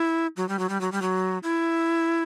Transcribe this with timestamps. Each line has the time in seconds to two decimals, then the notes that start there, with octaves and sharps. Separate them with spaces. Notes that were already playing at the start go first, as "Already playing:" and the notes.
Already playing: E4
0.37 F#3
0.49 G3
0.59 F#3
0.69 G3
0.81 F#3
0.92 G3
1.02 F#3
1.43 E4